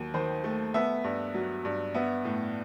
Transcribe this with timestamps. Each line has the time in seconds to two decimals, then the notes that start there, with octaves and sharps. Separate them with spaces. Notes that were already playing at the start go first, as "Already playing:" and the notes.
Already playing: D#2 F#3
0.14 D#3 C5
0.44 A3
0.74 B3 E5
1.04 G2
1.34 F#3
1.65 G2
1.94 B3 E5
2.25 A2